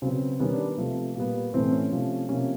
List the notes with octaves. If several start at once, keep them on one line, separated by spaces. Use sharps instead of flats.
C#3 F#3 B3 C4
D#3 G3 B3 C#4
D4
B3
C3 F3 A3
A#2 G3 B3
A2 E3 A3 C4
C#4
C3 F3 A3
C3 F3 A#3 C#4